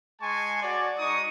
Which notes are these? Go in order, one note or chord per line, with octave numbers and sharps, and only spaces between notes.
G#3 G#5 A5 C6 C#6
F#4 C#5 D5
G#3 D#4 C#6 D#6